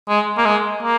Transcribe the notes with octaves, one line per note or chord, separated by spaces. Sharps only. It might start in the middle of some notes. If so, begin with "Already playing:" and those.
G#3
A#3
G#3
A#3